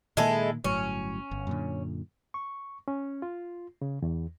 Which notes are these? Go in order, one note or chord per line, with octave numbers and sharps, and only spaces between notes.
A#2 D#3 G#3 A#3 E4 A4
G1 A2 F#3 C#4
G1
F#2 A#2 D3
C#6
C#4
F4
C#3
E2